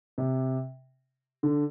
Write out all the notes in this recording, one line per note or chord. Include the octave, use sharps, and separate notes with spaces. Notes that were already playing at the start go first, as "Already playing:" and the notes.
C3
D3